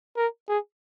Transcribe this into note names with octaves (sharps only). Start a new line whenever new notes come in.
A#4
G#4